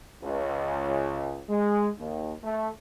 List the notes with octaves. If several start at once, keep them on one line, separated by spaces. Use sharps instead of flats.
C#2
G#3
D#2
A3